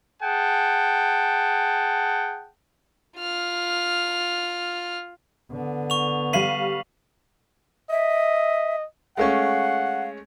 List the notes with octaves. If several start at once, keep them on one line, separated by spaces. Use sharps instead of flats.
G#4 F#5 G5 A5
F4 F6
D3 B3
C#6 F7
G3 F5 B6 C7 D#7 F#7
D#5 E5
G#3 A3 C#4 F5 F#5